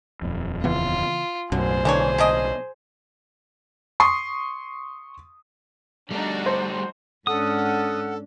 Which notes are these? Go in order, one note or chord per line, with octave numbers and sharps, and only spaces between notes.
D#1 F2
C#3 E3 B3 F4
B1 F#2 A2 D3 G#4 C5
D3 E3 D4 C#5
C#4 D4 D#5
C6 C#6 D#6 C7
G3 A3 D4 D#4 F#4
C5
G#2 C#4 D4 A4 F#5 D#6 F6